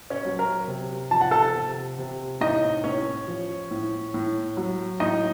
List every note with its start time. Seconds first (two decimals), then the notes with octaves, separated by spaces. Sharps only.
0.10 C#4 C#5
0.25 F#3
0.39 A#4
0.68 C3
1.11 F3 A5
1.21 F#5
1.31 A4 A5
1.55 C3
1.99 C3
2.41 A2 D#4 D#5
2.84 A2 C#4 C#5
3.27 F3
3.71 A2
4.14 A2
4.57 F#3
5.00 A2 D#4 D#5